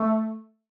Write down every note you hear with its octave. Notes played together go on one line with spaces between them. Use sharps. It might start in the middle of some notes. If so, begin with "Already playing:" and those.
Already playing: A3